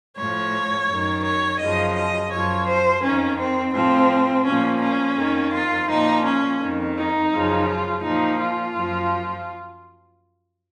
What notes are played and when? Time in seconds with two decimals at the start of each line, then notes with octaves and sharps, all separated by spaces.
0.17 A2 F3 C#5
0.88 F#2
0.93 D#3
1.24 C#5
1.60 F#2 C#3 F3 D#5
1.96 D#5
2.31 F#2 F3 C#5
2.67 C5
3.03 F2 D#3 C#4
3.39 C4
3.74 A2 F3 C4
4.45 A#2 F3 C#4
4.82 C#4
5.17 F2 D#3
5.53 F4
5.89 A#2 F3 D#4
6.25 C#4
6.61 F2 D#3
6.97 D#4
7.32 F#2 C#3 F3
7.68 F4
8.03 A#2 F3 D#4
8.40 F4
8.76 F#2 F3